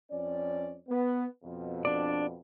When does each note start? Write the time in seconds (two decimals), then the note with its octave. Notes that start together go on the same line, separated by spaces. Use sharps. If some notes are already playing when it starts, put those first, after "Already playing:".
0.11 F2 C#4 D5
0.89 B3
1.44 F2 B2
1.85 D4 D5